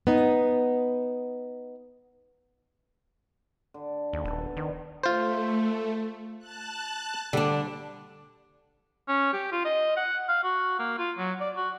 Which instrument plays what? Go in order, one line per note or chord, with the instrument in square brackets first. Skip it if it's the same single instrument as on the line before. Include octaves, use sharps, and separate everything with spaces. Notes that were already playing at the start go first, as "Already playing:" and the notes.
[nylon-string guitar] B3 D#4
[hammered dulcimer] D3
[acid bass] D#2
[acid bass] D#1 [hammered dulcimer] B3 A4 B4
[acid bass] D#3 [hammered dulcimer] C5 D5
[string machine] A3 [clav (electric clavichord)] F4 C5
[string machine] A5 F#6
[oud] D3 D4 [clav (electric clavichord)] G3
[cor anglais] C#4
G4
F4
D#5
F#5
F5
F#4
A#3
F4
F#3
D5
F#4